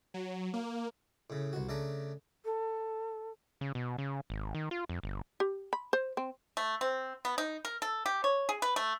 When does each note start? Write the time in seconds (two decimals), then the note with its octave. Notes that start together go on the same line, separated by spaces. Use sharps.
0.14 F#3
0.53 A#3
1.30 A2 C#3
1.53 C2 F#4
1.69 C#3 A3 D4 A5 A#5
2.45 A4
3.61 C#3
3.75 B2
3.98 C#3
4.30 G#1
4.55 D#3
4.71 F4
4.89 F2
5.03 G1
5.40 G4
5.73 B5
5.93 C5
6.17 C4
6.57 A3
6.81 C4
7.25 B3
7.38 D#4
7.65 A#4
7.82 A4
8.06 G4
8.24 C#5
8.49 G#4
8.62 B4
8.76 A3